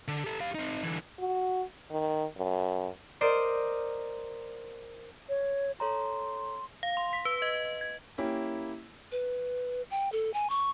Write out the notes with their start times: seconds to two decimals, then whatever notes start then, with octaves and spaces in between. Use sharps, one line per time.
0.08 D3
0.24 G4 A4
0.40 G4 F5
0.55 C4 D#4
0.83 D3 E3
1.19 F#4
1.91 D#3
2.38 F#2
3.21 A#4 C5 D5 D#5
5.29 C#5
5.80 A4 C#5 A#5 C6
6.83 F5
6.97 C6
7.13 B6
7.25 B4
7.42 D#5
7.81 G#6
8.18 A#3 C#4 E4 G4
9.12 B4
9.91 G5
10.12 A4
10.34 G#5
10.50 C#6